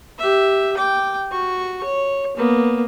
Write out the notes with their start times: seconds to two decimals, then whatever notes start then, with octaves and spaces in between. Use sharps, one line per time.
0.19 G4 E5
0.77 G5 D6
1.31 F#4 C#6
1.84 C#5
2.37 A#3 B3